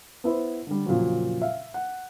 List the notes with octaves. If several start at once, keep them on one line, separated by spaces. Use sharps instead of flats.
B3 E4 B4 C5
D3 G3
F2 A#2 C#3 F#3
E5 F5
F#5